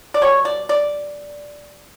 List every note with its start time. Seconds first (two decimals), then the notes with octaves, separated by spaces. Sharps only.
0.14 D5
0.22 B2 G3 C#5
0.45 D5
0.69 D5